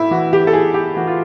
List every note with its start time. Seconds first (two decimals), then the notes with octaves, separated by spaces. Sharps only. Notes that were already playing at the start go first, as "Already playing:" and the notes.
Already playing: A2 E4
0.11 E3 F#4
0.33 G4
0.47 A4
0.53 A2 G#4
0.74 G4
0.96 E3 F#4
1.07 F4